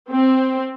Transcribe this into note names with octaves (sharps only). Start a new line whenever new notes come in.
C4